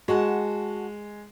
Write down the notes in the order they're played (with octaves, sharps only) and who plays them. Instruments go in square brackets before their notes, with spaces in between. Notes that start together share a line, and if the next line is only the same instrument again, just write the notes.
[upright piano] G#3 [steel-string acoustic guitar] F#4 F#5 A5